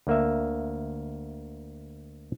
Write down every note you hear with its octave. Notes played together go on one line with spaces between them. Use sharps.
D2 A#3 E5